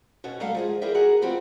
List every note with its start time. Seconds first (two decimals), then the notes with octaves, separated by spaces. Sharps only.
0.24 B2 C#4 F#4
0.40 G3 A3 A4 A#4 F5 F#5
0.55 F3 G#3 G#4
0.81 E4 G#4 A#4 D5 E5 G5
0.95 F#4 G#4 A#4 F#5
1.22 E3 F3 C4 F#4 G4 B4